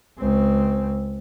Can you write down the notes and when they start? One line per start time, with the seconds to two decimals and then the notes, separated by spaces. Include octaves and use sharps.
0.19 C#2 C4